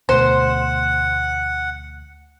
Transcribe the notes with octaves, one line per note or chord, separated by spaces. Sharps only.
D2 B2 A3 C5 F#5